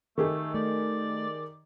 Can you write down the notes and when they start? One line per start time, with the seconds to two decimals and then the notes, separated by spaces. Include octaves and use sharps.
0.18 D#3 A3 G4 G#4
0.54 A3 D5